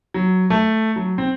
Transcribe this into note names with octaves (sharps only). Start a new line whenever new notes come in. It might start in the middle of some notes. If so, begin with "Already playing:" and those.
F#3
A3
F#3
C4